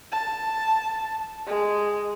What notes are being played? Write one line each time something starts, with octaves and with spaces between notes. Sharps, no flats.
A5
G#3